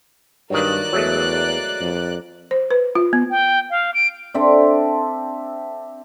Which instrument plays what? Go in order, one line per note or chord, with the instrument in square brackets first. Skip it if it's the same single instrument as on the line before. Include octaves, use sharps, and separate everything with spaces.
[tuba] G2 [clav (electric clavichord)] D#3 F#3 [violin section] A#3 D5 F#6
[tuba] E2 [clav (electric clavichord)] F#3 G#3 A3
[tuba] F2
[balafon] C5
B4
F4
B3
[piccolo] G5
F5
D7
[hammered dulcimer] C4 D4 A4 E5